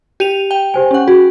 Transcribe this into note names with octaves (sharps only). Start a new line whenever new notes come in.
G4 D#7 F7
G5
G4 C5 G#5
C#4 F#5
F#4 G#4